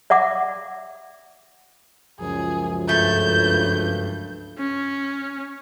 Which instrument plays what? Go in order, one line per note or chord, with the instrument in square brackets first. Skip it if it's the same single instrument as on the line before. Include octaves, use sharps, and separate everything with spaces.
[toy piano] D5 E5 F#5 D6
[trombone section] C#2 F#2 F3 [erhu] G#4
[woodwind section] G2 [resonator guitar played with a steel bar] A3 [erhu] G6
[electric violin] C#4